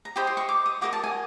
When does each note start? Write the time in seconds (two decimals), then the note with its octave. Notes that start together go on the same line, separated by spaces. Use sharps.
0.05 A#5
0.16 G4 C5 D#5 B5
0.27 C6
0.37 C#6
0.49 D6
0.66 D#6
0.81 F#4 A#4 D#5 D6
0.93 A5
1.04 G#5